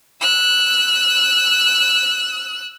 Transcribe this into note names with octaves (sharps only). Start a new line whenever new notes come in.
E6 F#6